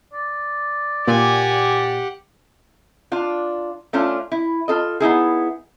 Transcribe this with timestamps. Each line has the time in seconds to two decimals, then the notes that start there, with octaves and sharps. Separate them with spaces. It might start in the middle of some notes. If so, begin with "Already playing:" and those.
0.13 D5
1.07 A#2 G4 F#5 G#5
3.12 D4 F4
3.93 A3 C#4 D4 F4
4.32 E4
4.68 F4 A4 D#5
5.00 B3 D#4 E4 G#4